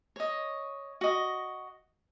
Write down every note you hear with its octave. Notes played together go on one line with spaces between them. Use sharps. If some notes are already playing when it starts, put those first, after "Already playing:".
C#5 D#5
F#4 D#5